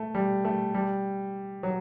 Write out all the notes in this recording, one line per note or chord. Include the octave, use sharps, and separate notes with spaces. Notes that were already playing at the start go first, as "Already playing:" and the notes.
Already playing: A3
G3
A3
G3
F#3